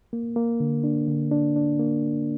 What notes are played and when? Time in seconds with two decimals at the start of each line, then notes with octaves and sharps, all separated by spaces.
0.13 A#3
0.36 A#3
0.60 D3
0.84 D4
1.08 D3
1.32 D4
1.56 D4
1.79 A#3